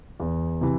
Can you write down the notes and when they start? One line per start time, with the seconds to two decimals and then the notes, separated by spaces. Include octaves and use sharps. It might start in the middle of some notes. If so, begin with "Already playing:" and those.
0.20 E2
0.61 C3 E3